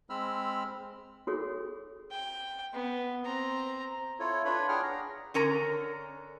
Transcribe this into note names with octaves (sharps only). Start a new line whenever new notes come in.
G#3 C4 B5 E6 F6
F#4 G#4 A4 C#5
G5
B3
C4 A#5
E4 F4 A4 C#5
D4 F4 B4 C#5 B5
D4 G#4 C#5 F#5 G5 F6
A#5
D3 C#4 A#4 A#5